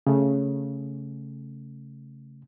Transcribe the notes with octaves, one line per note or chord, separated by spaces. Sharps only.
C#3 A3